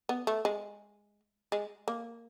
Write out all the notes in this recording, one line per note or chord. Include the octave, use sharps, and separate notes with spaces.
B3
A3
G#3
G#3
A#3